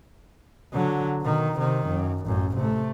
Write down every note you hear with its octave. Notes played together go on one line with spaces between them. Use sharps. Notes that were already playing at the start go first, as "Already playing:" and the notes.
D3 F#3
B2 D#3
C3 D#3
F#2
A1 F#2
C3 A3